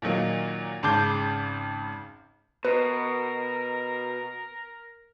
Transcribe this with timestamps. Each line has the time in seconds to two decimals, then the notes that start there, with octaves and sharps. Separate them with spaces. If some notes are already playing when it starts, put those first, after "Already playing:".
0.02 A#2 D#3 F#3 A#3
0.83 G#1 C#3 A5 D6 G6 C7
2.65 B2 A#4 B4